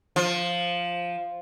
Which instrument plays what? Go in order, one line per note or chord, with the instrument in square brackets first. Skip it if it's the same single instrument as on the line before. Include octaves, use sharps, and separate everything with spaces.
[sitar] F3